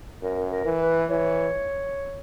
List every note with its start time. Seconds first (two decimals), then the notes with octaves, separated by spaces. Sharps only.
0.22 F#2 A#4
0.51 A#4
0.65 E3
0.81 B4
1.10 E3 C#5